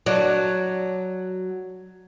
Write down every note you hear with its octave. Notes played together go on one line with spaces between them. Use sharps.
F#3 D4